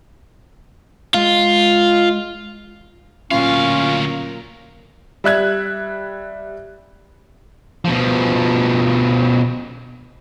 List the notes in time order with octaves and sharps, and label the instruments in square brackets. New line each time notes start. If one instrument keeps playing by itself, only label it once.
[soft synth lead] G#3 [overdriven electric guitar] F4
[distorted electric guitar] D2 F5 [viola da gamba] A#2 F#3 A#4 [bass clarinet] C#4 [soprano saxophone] F4
[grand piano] G3 E5 F#6 G#6
[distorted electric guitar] B2 F3